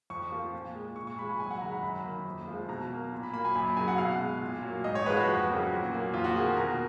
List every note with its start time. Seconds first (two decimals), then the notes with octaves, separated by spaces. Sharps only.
0.10 F2 C#6
0.31 F3 A#3
0.53 A#2
0.75 G#3
0.96 A#2 C#6
1.07 C#6
1.18 F3 G#3 B5
1.29 G#5
1.40 F#2 G#5
1.51 F#5
1.61 D#3 G#3 A#5
1.72 B5
1.83 F#2 B5
2.04 D#3 A#3
2.25 F2
2.48 F3 G#3
2.69 B2 A#5
2.91 F#3 A#3
3.13 A#2
3.23 B5
3.33 F#3 A#3 B5
3.45 G#5
3.55 F#2 B5
3.76 C#3 F#3 G#5
3.88 F#5
3.98 B2 F5
4.20 G#3
4.41 A#2
4.63 F#3 A#3
4.84 G#2 D#5
4.95 C#5
5.06 F3 G#3 B4
5.17 F#4
5.27 F2
5.49 C#3 F#3 A#3
5.72 A#2
5.93 F#3 A#3
6.14 F2 F4
6.24 F#4
6.36 D#3 A#3 G#4
6.46 A#4
6.57 B2 A#4